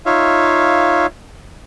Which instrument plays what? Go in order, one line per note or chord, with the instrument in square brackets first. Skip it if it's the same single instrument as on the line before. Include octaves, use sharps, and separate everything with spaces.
[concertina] D#4 F4 C#5 E5 F5